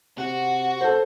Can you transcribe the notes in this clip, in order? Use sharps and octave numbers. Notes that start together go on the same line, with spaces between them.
C3 F#4
A4 C5